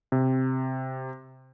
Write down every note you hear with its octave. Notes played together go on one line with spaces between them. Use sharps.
C3